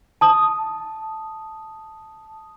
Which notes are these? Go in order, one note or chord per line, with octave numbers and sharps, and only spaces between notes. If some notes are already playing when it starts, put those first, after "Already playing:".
A5 D#6